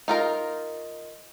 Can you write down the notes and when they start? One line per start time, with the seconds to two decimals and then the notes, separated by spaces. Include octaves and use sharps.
0.08 D#4 F4 A#4